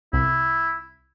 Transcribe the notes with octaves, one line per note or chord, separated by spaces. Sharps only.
C2 E4